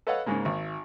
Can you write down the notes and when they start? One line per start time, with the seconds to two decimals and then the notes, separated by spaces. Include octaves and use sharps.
0.07 A4 B4 C#5 D#5 F5 F#5
0.26 G#2 C#3 G#3 A#3
0.45 G#1